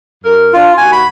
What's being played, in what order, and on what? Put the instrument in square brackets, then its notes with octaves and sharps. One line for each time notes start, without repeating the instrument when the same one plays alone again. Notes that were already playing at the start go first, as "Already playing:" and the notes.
[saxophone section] F#2 A#4
[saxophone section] F3 D4 [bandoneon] F4
[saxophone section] D#2 F#4 [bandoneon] G#5
[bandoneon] B5